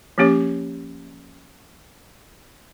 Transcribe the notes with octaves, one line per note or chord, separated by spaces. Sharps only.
F3 A#3 C#4 G4 C#5